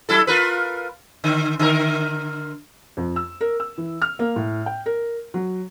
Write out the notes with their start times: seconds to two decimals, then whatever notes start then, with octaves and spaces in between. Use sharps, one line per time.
0.09 F#3 E4 A4
0.27 F4 A#4 B4
1.24 D3
1.59 D3 A#4
2.97 F2
3.16 E6
3.41 A#4
3.60 E6
3.78 E3
4.02 F6
4.19 A#3
4.36 A2
4.66 G5
4.86 A#4
5.34 F#3